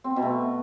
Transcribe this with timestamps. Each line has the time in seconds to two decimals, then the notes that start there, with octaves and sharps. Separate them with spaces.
0.04 C4
0.10 B3
0.16 B2
0.22 A3